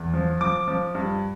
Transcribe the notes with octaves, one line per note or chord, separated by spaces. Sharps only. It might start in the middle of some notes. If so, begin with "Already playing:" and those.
Already playing: E2
F3
F3 D6
F3
G2